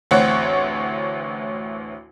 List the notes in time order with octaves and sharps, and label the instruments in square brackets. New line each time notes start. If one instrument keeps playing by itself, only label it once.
[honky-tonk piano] A1 D2 C4 C#5 F#5